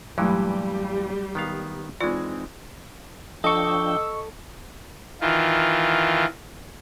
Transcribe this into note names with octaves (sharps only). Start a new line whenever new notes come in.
G2 A#2 E3 F#3 G3 A3 G4
D#3 B3 F5
E3 G#3 C4 D#4 F4 D5
F3 D4 A4 D#5 G5 C#6 E6
D#3 E3 F4